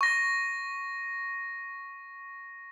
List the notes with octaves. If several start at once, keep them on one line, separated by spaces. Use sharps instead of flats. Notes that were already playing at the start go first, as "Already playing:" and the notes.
C#6 A#6